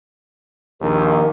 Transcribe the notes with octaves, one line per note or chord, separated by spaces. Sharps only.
A#1 D#2 A#4